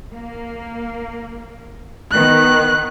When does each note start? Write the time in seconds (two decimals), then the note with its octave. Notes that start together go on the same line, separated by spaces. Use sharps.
0.13 A#3
2.12 D#3 B3 F#6